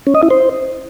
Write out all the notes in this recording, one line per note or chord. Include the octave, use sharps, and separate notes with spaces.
C#4
D#5
E4
C5